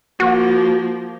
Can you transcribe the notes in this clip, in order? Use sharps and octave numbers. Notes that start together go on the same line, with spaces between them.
F3 A#3 F#4